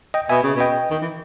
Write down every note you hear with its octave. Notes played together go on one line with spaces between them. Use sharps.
D#5 G5
B2 E5 G#5
C#3
B2 D#5 G5
D#3
E3